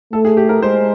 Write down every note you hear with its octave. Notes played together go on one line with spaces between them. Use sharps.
A3 A4
G#4
G4
A#4
G#3 C5